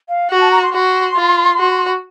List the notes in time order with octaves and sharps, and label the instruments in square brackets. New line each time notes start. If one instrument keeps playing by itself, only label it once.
[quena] F5
[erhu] F#4 [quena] F#5
[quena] A5
A#5
C6
[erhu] F#4 [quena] C6
[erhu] F4
F#4